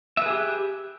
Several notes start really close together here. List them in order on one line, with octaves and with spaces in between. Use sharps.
E5 B4 G#4 G4